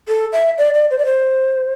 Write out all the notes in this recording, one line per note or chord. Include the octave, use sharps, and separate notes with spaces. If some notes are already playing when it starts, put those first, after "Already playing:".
A4
E5
D5
D5
C5
D5
C5